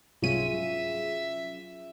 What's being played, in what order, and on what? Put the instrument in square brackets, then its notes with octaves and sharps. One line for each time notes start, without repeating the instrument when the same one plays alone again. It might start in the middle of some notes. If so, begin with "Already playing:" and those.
[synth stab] C2 G#2 D#7 [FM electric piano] F#3 C#4 G#4 [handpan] F4 [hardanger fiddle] E5